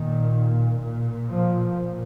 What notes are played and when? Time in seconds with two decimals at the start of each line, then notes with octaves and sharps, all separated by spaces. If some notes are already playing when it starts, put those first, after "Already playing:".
Already playing: A#2 D#3
0.82 A#2
1.28 F3
1.74 A#2